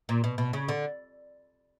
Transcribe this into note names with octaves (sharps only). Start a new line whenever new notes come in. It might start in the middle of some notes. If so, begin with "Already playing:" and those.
A#2
B2
B2
C#3
D3